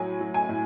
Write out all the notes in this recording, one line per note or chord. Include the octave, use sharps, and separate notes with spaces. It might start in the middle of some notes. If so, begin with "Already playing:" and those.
Already playing: A2 F#3 G#5
F#3
G#5
A2